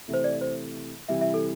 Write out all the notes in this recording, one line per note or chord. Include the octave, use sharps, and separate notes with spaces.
C3 E3 A3
C5
D5
C5
C3 E3 G3 E4 E5
E5
A4